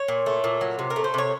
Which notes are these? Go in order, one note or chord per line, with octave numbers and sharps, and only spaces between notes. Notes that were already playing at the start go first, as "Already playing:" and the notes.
Already playing: C#5
A#2
A3
A#2
F#3
C3
A#4
A3
C5
C3 C#5